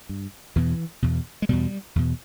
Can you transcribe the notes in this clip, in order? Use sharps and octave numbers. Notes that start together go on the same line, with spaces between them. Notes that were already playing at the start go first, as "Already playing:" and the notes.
G2
E2 B2 E3
E2 B2
G#3
E2 B2 G3
E2 B2